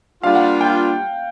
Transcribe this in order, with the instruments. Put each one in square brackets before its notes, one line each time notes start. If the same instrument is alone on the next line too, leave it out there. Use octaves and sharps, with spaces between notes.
[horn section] G3 A#3 D4 F4 [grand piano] F5
[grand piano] F#5
G5